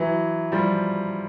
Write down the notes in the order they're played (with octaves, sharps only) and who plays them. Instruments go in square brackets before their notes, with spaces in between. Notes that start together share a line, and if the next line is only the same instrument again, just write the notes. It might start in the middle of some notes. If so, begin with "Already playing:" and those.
Already playing: [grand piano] E3 F#3
F3 G3